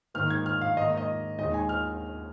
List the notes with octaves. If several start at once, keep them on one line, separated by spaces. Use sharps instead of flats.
G#2 D#3 A#3 F6
G#6
F6
F5
G#2 D#3 A#3 D#5
D#5
D#2 D#3 G#3 D#5
G#5
F6